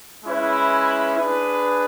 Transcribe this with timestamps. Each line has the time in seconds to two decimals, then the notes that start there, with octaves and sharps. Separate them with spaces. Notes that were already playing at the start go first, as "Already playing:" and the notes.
0.24 G#3 C#4 E4 B4
1.19 D4 G#4 B4